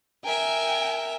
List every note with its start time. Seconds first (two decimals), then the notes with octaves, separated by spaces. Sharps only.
0.24 A#4 E5 G5 G#5